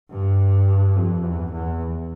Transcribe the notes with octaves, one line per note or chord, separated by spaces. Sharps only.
G2
F2
E2
E2